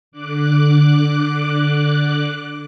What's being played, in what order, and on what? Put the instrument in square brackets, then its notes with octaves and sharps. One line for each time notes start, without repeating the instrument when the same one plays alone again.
[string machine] D3 D6 F#6